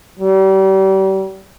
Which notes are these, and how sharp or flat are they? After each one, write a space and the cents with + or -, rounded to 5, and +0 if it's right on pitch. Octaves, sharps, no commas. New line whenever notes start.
G3 -35